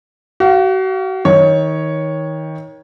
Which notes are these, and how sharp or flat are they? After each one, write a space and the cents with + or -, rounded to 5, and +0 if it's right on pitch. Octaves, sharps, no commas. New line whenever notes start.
F#4 +35 F5 +0
D#3 +25 C#5 +0